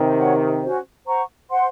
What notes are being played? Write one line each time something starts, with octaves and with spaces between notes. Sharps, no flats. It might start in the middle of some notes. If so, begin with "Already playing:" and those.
Already playing: C3 D#3
F#4 C#5 F#5
C#4 F#4 C5
C5 F#5 A#5 C#6
C5 F#5 C6